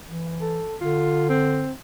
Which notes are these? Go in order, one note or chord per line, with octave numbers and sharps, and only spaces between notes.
E3
A4
D3 F4
C4